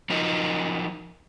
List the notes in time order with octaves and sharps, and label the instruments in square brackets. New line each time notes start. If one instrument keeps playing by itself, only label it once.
[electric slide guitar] F3 F#3 D#4 A#4 D#5